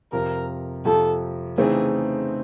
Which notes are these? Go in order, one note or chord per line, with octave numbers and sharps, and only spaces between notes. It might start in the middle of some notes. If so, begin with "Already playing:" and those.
F2 C3 F3 A#4
F2 C3 F3 A4
C#3 E3 A3 C4 D#4 G#4